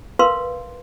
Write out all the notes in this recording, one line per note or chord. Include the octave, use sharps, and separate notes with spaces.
A#4 B4 F5 C6